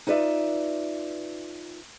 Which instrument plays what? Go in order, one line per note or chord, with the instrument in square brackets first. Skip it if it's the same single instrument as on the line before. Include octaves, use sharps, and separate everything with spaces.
[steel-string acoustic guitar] D#4 F4 B4 D5 E5